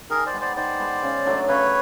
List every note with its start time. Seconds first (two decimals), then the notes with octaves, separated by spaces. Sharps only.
0.10 D#3 G#4 A#4
0.26 C5 D5
0.33 G#3 B3
0.41 C5 D5
0.56 D#3 C5 D5
0.79 G#3 B3
1.03 C#3
1.26 F#3 A3 D4
1.48 C#3 B4 C#5